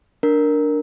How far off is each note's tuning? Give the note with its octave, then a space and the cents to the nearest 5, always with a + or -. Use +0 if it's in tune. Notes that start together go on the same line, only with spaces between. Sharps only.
D4 +0 A#4 +0